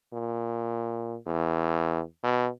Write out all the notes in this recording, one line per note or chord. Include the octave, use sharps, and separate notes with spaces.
A#2
E2
B2